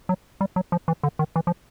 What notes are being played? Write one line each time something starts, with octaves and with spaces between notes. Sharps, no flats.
F#3
G3
F#3
F3
E3
D3
D#3
E3
F3